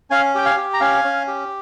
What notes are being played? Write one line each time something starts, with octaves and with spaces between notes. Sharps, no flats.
C#4 F5 G#5
G4 G5
F5 G#5
G4
A#5
C#4 F5 G#5
C#4
G4